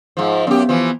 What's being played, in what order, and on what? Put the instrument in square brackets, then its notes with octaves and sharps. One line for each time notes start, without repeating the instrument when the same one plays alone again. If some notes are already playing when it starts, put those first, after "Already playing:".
[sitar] G#2 F3
[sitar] F#2 G4 [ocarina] B3
[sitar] E3 F3